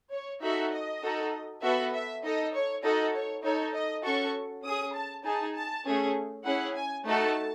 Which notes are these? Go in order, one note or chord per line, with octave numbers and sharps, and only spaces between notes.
C#5
D#4 F#4 A4 E5
D#5
D#4 F#4 A4
B3 F#4 A4 E5
E5
D#4 A4 D#5
C#5
D#4 F#4 A4 D#5
C#5
D#4 A4 C#5
D#5
C#4 F#4 A4 C#6
C#4 G#4 D#6
A5
D#4 G#4 A5
A5
A3 C#4 G#4
C#4 E4 G#4 F#5
G#5
A3 D#4 F#4 A4 A5